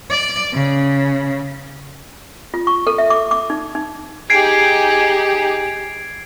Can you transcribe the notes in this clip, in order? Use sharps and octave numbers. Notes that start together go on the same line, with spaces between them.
D5
C#3
F4
C#6
A4
E5
D6
D6
D#4
D#4
D#4 G4 G#4 G#6 C7 D7